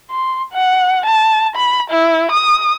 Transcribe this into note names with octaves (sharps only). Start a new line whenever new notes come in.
C6
F#5
A5
B5
E4
D#6